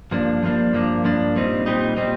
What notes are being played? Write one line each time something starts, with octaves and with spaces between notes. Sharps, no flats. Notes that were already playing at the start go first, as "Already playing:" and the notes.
G2 F3 A#3 D4
G2 F3 A#3 D4
G2 F3 A#3 D4
G2 F3 A#3 D4
A#2 G3 C4 D#4
A#2 G3 C4 D#4
A#2 G3 C4 D#4